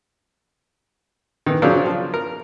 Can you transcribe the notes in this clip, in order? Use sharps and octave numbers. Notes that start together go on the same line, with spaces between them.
D#3 E3
C#3 F3 F#3 C4 D4 A#4
F3
A#4